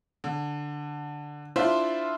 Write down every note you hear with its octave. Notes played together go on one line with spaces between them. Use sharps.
D3
D4 E4 F4 C5 E5 C6